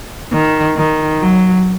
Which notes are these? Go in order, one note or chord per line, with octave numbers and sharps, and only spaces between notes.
D#3
D#3
F#3